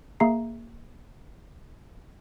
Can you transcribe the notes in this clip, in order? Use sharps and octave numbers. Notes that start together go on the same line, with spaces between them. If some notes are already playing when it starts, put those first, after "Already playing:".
A#3 G#4 E5 A#5 C7